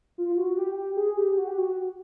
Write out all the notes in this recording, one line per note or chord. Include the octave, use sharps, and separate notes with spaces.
F4
F#4
G4
G4
G4
G#4
G4
F#4
G4
F#4